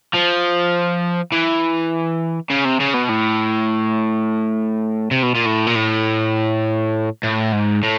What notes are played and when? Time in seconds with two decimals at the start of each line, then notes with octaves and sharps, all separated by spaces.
0.13 F3
1.32 E3
2.50 C#3
2.65 C3
2.80 C#3
2.94 B2
3.09 A2
5.11 C3
5.23 B2
5.35 A#2
5.46 A2
5.67 A#2
5.75 A2
7.23 A2
7.52 G#2
7.83 A2